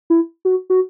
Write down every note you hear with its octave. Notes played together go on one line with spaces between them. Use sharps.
E4
F#4
F#4